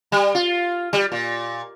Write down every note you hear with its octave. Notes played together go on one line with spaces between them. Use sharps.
G3
F4
G3
A#2